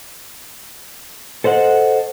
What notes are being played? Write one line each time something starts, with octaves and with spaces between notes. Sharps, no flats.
A4 C5 D#5 F#5